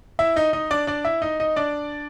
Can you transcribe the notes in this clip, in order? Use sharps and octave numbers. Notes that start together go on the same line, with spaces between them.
E4 E5
D#4 D#5
D#4 D#5
D4 D5
D4 D5
E4 E5
D#4 D#5
D#4 D#5
D4 D5